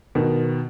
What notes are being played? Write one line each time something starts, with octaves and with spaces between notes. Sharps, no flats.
B2 D#3